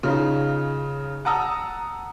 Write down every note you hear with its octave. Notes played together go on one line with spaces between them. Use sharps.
C#3 D#4 F4
F#5 A5 A#5 D#6 E6